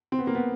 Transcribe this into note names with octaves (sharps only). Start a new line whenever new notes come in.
C4
B3
A#3
B3